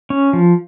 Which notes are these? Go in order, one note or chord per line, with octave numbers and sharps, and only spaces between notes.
C#4
F3